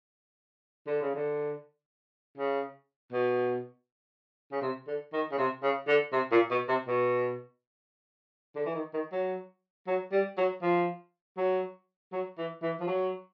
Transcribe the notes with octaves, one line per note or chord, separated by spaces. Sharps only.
D3
C#3
D3
C#3
B2
C#3
C3
D3
D#3
C#3
C3
C#3
D3
C3
A#2
B2
C3
B2
D3
E3
D#3
D#3
F#3
F#3
G3
F#3
F3
F#3
F#3
E3
E3
F3
F#3